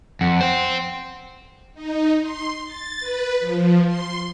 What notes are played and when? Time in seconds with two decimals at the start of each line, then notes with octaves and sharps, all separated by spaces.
0.21 F2 F#5
0.41 C5 G5
1.74 D#4
2.21 C6
2.65 A6
3.00 B4
3.40 F3
3.86 C6